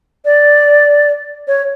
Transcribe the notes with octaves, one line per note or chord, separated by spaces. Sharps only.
D5
C#5